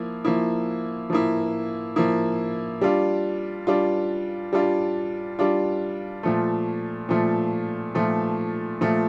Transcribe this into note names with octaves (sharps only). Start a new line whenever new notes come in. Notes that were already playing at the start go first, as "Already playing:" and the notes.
Already playing: F3 A#3 E4
F3 A#3 E4
F3 A#3 E4
F3 A#3 E4
G3 D4 F4
G3 D4 F4
G3 D4 F4
G3 D4 F4
A#2 F3 A3
A#2 F3 A3
A#2 F3 A3
A#2 F3 A3